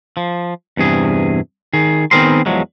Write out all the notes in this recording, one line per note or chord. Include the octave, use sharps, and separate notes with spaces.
F3
E2 G2 C3 G#4
D#3 G#4
D#3 B3 C4 G#4 A#4 C6
E2 F3 F#3 G#3